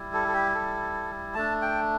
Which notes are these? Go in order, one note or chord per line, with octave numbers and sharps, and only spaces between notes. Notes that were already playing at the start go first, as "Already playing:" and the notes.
Already playing: G3 E4
A4
A4
G4
A4
A3 D4 A5
G5